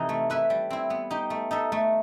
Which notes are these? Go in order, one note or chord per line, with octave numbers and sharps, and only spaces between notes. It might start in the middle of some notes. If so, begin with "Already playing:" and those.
Already playing: C3 E3 D#4 A4
A3
E4 B4 E5
G3
C4 E4
B3
D#4 G4
A3
D#4 A4 E5
A3